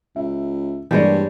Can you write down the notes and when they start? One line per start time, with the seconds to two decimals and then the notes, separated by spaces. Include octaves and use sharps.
0.16 C#2 E5
0.91 G2 E3 G3 G#3 A#3 D4 C#5